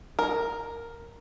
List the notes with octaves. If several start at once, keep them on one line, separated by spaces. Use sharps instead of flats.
A#4